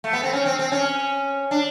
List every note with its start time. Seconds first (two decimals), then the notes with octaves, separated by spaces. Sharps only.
0.04 A3
0.13 B3
0.23 C4
0.33 C#4
0.46 C4
0.59 C4
0.72 C#4
1.51 D4